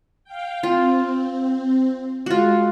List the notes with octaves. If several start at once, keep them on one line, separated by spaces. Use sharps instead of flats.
F5 G5
C4 F4
G#3 F4 F#4